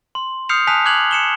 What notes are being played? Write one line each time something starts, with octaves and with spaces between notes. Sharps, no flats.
C6
D#6 F6 G6 C7 C#7 F7
G#5 A5 D#6 F#6 B6 F7
D6 F#6 G#6 F7 F#7
C#7 E7 G7